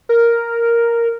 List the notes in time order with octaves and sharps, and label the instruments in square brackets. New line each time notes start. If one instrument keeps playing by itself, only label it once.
[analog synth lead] A#4